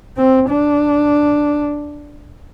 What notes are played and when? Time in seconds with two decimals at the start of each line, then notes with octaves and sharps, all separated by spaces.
0.17 C4
0.49 D4